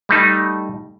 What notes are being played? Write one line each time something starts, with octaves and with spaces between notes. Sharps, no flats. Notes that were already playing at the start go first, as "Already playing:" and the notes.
G3 A3 D#4